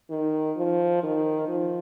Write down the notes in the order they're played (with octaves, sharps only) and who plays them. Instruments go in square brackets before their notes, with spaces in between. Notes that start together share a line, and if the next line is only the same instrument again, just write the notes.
[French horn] D#3
F3
D#3
F3